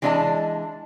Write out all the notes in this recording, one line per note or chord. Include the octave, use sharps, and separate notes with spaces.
E3 G#3 D4 B4 D#5 A5